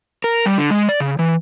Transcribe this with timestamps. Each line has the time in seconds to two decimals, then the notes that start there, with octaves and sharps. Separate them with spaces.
0.24 A#4
0.46 G3
0.58 D3
0.71 G#3
0.89 D5
1.00 C#3
1.19 E3